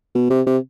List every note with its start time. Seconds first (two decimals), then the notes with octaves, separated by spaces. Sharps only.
0.15 B2
0.30 C3
0.46 C3